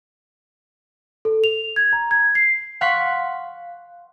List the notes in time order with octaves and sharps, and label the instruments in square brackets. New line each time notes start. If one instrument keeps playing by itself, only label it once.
[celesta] A4
F7
G#6
A#5
G#6
C7
[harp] F5 F#5 C6 C#6 B6 C7